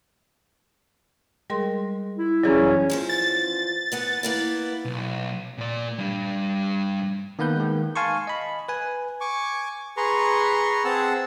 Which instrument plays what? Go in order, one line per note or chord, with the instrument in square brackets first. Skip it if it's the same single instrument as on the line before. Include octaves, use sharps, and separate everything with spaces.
[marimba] G3 A#4 C6 [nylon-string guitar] G#3
[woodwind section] E4
[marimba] F#2 E3 F#3 [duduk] C#4 [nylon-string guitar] G#4 C#5 D5
[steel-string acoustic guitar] E2 F3 C5
[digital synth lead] A6
[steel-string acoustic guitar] E2 B3 F#5
A#3 B3 E4
[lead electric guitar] B1
A#2 D5
G3 D4
[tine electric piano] D#3 A#3 B3 B4 G6
D#3 G#3
F5 G#5 A5 C6 C#6
D#5 B5
B4 G#5
[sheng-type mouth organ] G#5 C#6 D6
G#4 B4 A#5 C6 C#6
C4 G#4 F#5 A5 E6